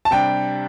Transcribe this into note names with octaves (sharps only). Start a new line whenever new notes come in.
A5
C3 G3 D4 G5